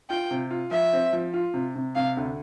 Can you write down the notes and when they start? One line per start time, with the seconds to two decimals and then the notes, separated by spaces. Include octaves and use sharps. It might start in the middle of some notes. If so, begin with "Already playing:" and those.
0.10 F4 G5
0.31 C3
0.50 F4
0.71 F3 E5
0.93 C4
1.13 F3
1.33 F4
1.54 C3
1.75 C3
1.95 C3 F5
2.17 D2